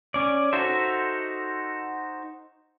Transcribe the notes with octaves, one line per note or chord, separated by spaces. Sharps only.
C#4 D5
D#4 F#4 A4 C5 E5